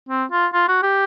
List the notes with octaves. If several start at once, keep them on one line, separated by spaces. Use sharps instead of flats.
C4
F4
F4
F#4
G4